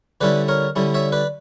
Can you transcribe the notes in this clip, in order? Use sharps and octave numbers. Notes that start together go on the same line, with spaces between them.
D3 G3 C#4 E4 B4 D5
A#4 C#5
D3 G3 C#4 E4
C#5 E5
B4 D5